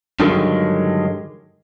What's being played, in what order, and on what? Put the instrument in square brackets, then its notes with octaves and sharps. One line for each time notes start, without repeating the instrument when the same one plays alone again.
[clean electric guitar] G2 D3 D#3 F#3 G#3